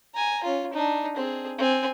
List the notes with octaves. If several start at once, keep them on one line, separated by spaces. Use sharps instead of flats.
G#5 A#5
C#4 F4
D4 D#4
C4 G#4
C4 G#5